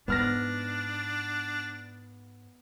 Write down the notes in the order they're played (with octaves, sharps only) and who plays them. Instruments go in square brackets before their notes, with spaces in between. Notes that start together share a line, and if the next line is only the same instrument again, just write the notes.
[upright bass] G#2 [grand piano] B3 F6 A#6 [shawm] D4